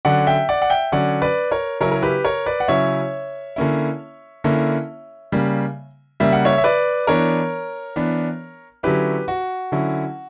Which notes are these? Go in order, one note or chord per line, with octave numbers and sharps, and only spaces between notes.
D3 F#3 C#4 D5 F#5
E5 G5
D5 F#5
F#5
E5 G5
D3 F#3 C#4 D5 F#5
B4 D5
A#4 C#5
C#3 F#3 C#4 E4 A#4 C#5
A#4
G4 B4
A#4 C#5
B4 D5
F#5
C#3 F#3 C#4 E4 C#5 E5
D3 A#3 C#4 E4
D3 A#3 C#4 E4
C#3 G3 A#3
C#3 G3 A#3 E5
F#5
C#5 E5
E5
B4 D5
E3 B3 D4 A#4 C#5
E3 B3 D4
D3 F#3 C#4 E4 G4 B4
F#4
D3 F#3 C#4 E4